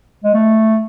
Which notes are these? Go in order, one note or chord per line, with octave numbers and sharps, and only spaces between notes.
G#3
A3